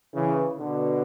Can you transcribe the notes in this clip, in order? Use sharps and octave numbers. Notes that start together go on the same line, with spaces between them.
C#3 E3
B2 D3